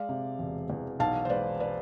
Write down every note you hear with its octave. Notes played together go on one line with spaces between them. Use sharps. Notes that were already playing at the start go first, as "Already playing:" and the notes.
Already playing: G#3 D5 F5
C3
E1
E2
B1 F5 A5
C5
G#3 B4 D5
B4 D5